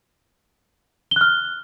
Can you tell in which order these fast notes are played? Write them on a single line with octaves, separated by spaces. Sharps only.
G7 F#6 F6